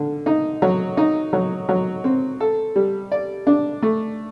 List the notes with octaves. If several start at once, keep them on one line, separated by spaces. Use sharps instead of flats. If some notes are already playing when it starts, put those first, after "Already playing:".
Already playing: D3
D#4
F#3
D#4
F#3
F#3
C4
A4
G3
D5
D4
A3